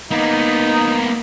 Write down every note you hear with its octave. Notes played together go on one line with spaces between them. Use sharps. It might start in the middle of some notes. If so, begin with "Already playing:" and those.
A#3 B3 D#4